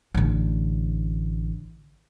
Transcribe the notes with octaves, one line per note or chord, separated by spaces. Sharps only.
A1 D3